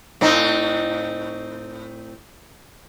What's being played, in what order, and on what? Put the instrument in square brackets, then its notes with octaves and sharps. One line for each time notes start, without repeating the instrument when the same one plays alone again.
[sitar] A2 C4 D#4